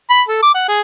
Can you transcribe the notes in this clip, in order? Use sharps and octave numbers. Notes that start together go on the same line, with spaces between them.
B5
A4
D6
F#5
G#4